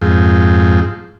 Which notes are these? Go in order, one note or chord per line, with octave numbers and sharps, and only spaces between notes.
F2 G#2